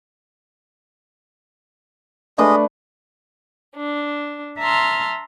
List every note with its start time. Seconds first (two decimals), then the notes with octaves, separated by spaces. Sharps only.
2.38 G#3 A3 D4 B4 D#5
3.76 D4
4.57 E5 A5 A#5 C6 F6